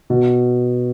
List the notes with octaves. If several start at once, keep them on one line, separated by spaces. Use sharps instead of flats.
B2